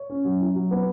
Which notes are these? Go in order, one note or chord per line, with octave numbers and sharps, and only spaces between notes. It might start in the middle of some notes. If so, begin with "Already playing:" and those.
Already playing: C#5
C#4
F#3
E4
F#3
B3